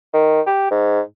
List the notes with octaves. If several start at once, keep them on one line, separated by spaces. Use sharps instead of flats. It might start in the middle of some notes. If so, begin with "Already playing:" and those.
D#3
G4
G#2